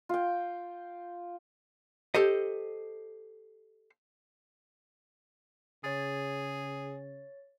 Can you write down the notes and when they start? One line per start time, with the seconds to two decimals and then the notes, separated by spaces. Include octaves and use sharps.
0.09 F4 G5
2.15 G4 A4 C5 D#5
5.84 C#3 G#4 C#5 A6